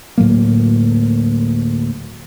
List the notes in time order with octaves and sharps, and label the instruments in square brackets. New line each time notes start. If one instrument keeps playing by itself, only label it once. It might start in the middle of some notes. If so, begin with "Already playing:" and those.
[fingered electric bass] D2 A2 F#3 A#3